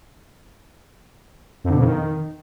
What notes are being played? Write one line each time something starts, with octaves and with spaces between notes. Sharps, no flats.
F2
D3
B2
F2
D#3